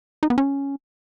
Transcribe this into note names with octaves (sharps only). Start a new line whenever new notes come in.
D#4
B3
C#4